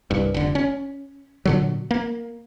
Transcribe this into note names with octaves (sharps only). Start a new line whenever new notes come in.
C2 G2
F1 D3
C#4
A#2 D3 F#3
A#3